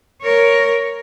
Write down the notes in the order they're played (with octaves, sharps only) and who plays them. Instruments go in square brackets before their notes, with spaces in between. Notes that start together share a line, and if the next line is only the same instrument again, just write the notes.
[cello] A#4 C#5